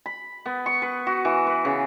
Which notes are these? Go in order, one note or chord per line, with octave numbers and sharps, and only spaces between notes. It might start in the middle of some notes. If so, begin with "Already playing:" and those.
B5
B3
C#6
B4
F#4
E3
B4
C#3